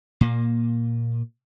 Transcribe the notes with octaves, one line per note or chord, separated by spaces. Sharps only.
A#2 A#3